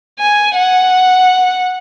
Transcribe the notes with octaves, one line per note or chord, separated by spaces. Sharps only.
G#5
F#5